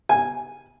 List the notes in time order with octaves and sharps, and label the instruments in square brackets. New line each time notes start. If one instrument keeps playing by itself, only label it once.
[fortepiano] G#5